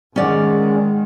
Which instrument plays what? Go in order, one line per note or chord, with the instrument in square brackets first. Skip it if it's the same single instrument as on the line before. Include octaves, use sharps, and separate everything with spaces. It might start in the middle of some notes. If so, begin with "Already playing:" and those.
[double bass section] G#2 D#3 G#3 [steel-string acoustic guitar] C#4 D5 F#5